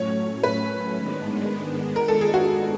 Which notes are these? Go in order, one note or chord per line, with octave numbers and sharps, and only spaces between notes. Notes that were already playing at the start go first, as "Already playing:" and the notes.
Already playing: A2 F#3 A3 C#4 C#5
B4
G#2 D#3 G#3 B3 D4
A#4
A4
G#4
F#4